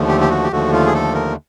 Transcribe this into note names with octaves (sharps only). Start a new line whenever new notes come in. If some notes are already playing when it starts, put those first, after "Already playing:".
Already playing: D#2 D3 F3 A3
G4
G4
F#4
G4
D#2 D3 F3 A3 F#4
F4
G#4
A4
A#4